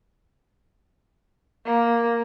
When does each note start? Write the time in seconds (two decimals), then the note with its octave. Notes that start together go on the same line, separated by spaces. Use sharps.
1.66 A#3